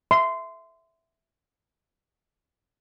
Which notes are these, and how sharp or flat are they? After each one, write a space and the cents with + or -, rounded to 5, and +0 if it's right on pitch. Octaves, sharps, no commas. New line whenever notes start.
E5 +0 C6 -20